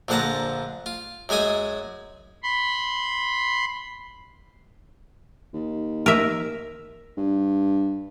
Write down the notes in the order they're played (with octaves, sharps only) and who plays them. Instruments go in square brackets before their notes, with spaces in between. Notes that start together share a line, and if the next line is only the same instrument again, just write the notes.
[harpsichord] A#1 D3 F3 F#5 A5 A#5
F4
F#2 G#3 E5 G#5 D#6
[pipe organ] B5 C6
[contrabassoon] D#2
[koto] A#4 E5
[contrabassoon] G2